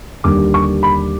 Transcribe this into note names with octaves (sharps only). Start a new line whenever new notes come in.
D#2 D3 G3 D6
C#6
B5